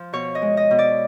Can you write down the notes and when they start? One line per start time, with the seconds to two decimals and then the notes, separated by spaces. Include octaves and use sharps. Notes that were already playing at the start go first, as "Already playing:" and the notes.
Already playing: F3
0.13 B2 C#5
0.35 D#5
0.42 G#3
0.57 D#5
0.71 B2
0.79 D5